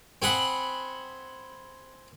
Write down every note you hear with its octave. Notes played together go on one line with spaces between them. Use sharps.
C4 G#4 F#5 B5